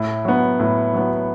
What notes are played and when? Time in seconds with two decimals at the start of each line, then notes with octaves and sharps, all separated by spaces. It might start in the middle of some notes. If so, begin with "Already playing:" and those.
Already playing: A2
0.25 F#3 B3
0.60 A2
0.94 F#3 B3